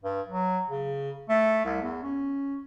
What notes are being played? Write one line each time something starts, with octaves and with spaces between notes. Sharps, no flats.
G2
F#3
C#3
A3
C2
E2
C#4